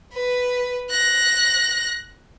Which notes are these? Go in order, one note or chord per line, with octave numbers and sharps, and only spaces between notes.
B4
F#6 A#6